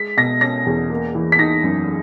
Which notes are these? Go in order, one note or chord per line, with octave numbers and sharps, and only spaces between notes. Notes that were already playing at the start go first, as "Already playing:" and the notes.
Already playing: G#3 B6
B2 A#6
C#4 A#6
E2
A#3
E3
B6
D#4 A#6
F#2